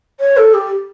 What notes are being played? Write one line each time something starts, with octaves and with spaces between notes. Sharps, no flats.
C#5
A4
G4